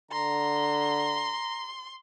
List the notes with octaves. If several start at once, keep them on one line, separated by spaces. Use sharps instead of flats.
D3 A#5 C6